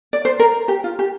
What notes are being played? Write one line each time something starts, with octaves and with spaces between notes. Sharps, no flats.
D5
C5
A#4
G4
F4
G4